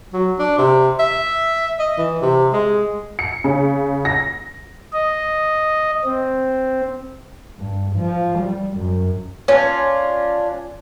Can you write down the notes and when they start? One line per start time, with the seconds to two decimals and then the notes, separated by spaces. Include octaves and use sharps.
0.13 F#3
0.39 D4
0.58 C3
0.99 E5
1.79 D#5
1.98 E3
2.22 C3
2.53 G#3
3.19 C#7
3.44 C#3
4.05 A#6
4.93 D#5
6.04 C4
7.59 G2
7.97 F3
8.40 G3
8.78 F#2
9.48 C#4 D4 F4